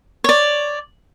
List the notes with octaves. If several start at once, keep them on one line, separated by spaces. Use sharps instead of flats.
C#5 D5